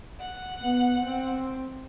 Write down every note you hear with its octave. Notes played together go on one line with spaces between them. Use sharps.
F#5
B3
C4